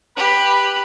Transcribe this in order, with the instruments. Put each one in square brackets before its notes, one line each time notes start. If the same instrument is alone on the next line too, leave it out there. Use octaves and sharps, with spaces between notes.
[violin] G4 [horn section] B4 B5